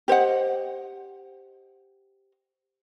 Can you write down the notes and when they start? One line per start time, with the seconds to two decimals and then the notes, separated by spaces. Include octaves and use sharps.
0.08 G4 C5 D#5 F#5